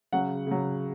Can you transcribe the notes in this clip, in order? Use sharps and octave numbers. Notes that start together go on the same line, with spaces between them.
C#3 F#3 F#5
C#3 F#3